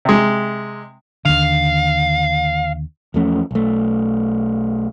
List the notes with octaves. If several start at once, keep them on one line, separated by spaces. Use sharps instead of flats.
C3 G#3
D#2 D3 F5
E2 F3 A3 C#4
B1 A3